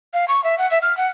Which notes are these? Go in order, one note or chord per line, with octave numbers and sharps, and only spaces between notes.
F5
C#6
E5
F#5
E5
F6
F#5